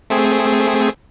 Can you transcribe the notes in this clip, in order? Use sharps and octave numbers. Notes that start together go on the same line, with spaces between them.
A3 C4 G#4